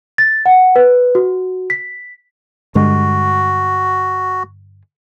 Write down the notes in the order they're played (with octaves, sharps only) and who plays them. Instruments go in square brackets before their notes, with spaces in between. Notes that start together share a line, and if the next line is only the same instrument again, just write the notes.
[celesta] A6
F#5
B4
F#4
B6
[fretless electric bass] G2 D3 G#3 [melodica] F#4